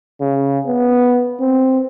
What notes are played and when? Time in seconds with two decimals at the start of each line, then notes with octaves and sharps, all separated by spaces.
0.20 C#3
0.66 B3
1.40 C4